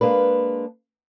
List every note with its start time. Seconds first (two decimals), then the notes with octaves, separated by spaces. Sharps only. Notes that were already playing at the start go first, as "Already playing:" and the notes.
0.01 G#3 A#3 D4 B4